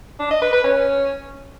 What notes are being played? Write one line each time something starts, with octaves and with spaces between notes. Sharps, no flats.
D4
D#5
B4
B4
C#4